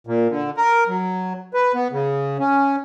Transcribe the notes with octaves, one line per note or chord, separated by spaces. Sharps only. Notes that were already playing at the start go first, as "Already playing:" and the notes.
A#2
D3
A#4
F#3
B4
B3
C#3
C#4